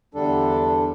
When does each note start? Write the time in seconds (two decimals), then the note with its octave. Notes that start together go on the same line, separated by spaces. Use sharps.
0.14 E2 D3 G3 D4 A4